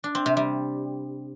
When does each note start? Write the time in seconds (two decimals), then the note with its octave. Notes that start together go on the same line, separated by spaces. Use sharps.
0.04 D4
0.15 C4
0.26 C3
0.37 G3